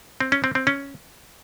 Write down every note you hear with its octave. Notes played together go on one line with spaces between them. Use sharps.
C4
C#4
C4
C4
C#4